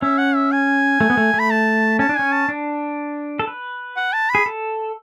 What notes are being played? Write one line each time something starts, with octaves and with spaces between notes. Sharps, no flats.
C#4 E5
F#5
E5
G#5
A3
B3
A3
A3
B5
A5
C#4 A5
D4
C#4 G#5
A5
D4
A4
B4
F#5
A5
B5
G#4
A4